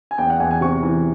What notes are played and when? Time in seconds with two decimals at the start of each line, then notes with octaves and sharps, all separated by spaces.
0.11 G#5
0.18 E2 G5
0.30 F#5
0.40 E2 G#5
0.51 G#5
0.61 C3 C#6
0.83 E3